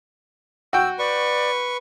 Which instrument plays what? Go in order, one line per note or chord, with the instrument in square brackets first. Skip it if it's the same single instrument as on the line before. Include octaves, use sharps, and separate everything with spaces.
[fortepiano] F#4 G5 [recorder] E6
[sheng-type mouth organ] B4 C#6 [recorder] D5